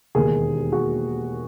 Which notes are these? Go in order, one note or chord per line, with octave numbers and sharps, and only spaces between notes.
E1 D#2 D#3 G#4 A#4
F#4 G#4